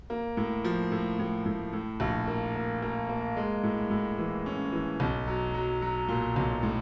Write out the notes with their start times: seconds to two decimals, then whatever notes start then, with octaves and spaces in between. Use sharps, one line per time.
0.10 A#3
0.37 A2
0.64 F3
0.92 A2
1.19 A2
1.46 A2
1.73 A2
2.00 A#1
2.28 A#3
2.55 A#3
2.82 A#3
3.09 A#3
3.37 G#3
3.63 A2
3.90 A2
4.18 E3
4.46 C#4
4.72 E3
5.00 B1
5.27 F#3
5.54 F#3
5.82 F#3
6.08 A#2
6.36 B1
6.63 A2